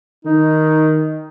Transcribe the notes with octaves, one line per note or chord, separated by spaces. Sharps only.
D#3 D#4